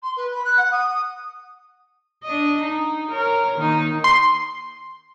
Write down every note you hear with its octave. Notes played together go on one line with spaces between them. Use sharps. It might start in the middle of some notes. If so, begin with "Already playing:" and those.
C6
B4
B5
F#6
F#5
D#6
D#6
D4 D#5
D#4
A#4 C#5
D#3 A#3 D#4
C6